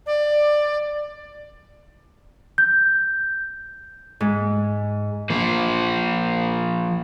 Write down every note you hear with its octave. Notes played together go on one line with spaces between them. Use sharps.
D5
G6
G#2
F3 A#3